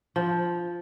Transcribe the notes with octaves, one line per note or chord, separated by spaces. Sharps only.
F3